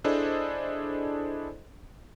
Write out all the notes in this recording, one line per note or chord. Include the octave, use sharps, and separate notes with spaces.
D4 E4 G#4 A4 C5 D#5